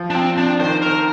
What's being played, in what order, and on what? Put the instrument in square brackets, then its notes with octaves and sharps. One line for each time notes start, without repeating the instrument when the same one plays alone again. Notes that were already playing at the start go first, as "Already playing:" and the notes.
Already playing: [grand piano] F3
[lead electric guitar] D4
C4
D4
[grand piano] D#3 [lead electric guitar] C5
[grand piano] D#3 [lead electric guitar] A#4